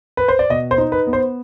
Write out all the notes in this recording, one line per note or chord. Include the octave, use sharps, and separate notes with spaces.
B4
C5
D5
B2 D#5
C5
D#4
B4
B3
C5